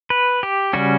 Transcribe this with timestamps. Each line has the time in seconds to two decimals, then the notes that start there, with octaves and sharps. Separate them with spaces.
0.10 B4
0.43 G4
0.73 C#3 G3 C#4 F#4